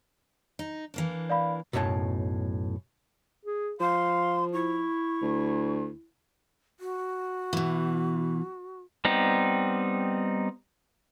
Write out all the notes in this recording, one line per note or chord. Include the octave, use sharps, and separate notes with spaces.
D#4
E3 A#3 D4
D5 F5 B5
B1 F#2 A2 C#5 A5
G#4
F3 F5 C6
E4 C#6
D2
F#4
B2 E3
G3 B3 C4 D#4